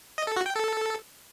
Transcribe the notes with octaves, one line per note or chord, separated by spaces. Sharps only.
D#5
A4
F#4
G5
A4